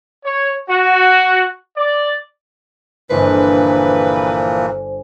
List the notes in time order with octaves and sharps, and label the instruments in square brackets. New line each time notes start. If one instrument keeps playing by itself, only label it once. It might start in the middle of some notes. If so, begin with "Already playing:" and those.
[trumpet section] C#5
F#4
D5
[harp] G1 [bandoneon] A#2 E3 F3 [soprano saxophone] B4 [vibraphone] C5 G#5